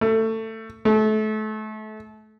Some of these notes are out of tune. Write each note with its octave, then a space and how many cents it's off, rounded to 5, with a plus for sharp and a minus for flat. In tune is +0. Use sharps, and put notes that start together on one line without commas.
A3 +20
A3 -30